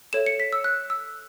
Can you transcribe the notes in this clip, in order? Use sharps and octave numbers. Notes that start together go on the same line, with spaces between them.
A4 C#5 E5 E7
C#7
B6
E6
F#6
E6